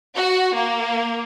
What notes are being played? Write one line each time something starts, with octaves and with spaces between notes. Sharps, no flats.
F#4
A#3